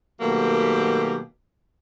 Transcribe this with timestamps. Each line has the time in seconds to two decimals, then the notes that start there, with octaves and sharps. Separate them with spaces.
0.20 B2 D#3 F#3 A3 A#3 G4